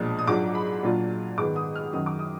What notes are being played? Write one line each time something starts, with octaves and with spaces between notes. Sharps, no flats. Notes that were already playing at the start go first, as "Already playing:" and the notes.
Already playing: B1 A#2 F3 G#3 D4 D#6
D#6
G#2 F#3 D4 F4 D6
B5
A#2 F#3 D4 F4
G#2 D#3 G#3 B3 D6
D#6
F6
F#2 D#3 F#3 D#6
D6
D#6